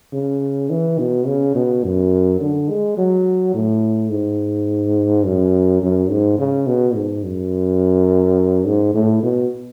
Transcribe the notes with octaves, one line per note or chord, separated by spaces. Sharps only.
C#3
E3
B2
C#3
B2
F#2
D3
G#3
F#3
A2
G#2
F#2
F#2
G#2
C#3
B2
G#2
F#2
G#2
A2
B2